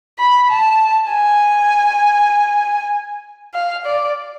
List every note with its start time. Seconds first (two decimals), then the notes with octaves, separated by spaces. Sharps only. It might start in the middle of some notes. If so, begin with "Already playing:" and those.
0.19 B5
0.50 A5
1.10 G#5
3.55 F5
3.86 D5